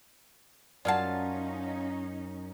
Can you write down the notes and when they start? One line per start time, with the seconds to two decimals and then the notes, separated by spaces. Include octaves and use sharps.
0.85 F#2 C#4 D#4 F4 D5 F5 F#5 A5